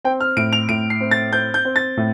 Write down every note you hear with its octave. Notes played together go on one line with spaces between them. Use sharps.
C4 G5
F6
A2 D7
F7
A2 D7
C7
C4
A6
C4 G6
G6
C4
A6
A2